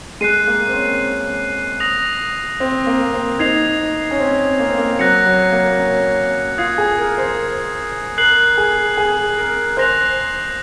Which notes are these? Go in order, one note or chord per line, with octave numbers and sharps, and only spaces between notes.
G#3 F#6 C7 D#7
A#3
C4
C#4
D#6 A#6 F7
C4
A#3
C4
D#4 G#6 C7 F7
C#4
C4
A#3
C4
A#3
F#3 F#6 A#6 C#7
F#3
A#3
C#4
F4 D#6 G#6 C7
G#4
A#4
C5
A#4 F#6 C7 F#7
G#4
G#4
A#4
C5 F#6 A#6 F7